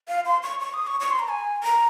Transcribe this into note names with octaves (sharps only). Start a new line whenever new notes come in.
F5
C6
C#6
C#6
D#6
C#6
C#6
C6
A#5
G#5
A#5